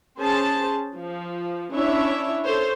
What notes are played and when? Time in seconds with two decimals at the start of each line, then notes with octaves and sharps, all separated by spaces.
0.19 C#4 G#4 C5 A5
0.95 F3
1.73 C#4 D4 E4 C#5 E5
2.43 A4 C5 C#5